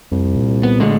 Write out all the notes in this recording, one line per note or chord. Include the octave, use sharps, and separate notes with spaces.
C2 F2
A#2
B3
A2 D3 G#3